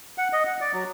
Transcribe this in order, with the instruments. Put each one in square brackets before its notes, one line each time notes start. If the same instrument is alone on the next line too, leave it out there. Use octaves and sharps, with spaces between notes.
[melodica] F#5
D#5
F#5
D5
F#3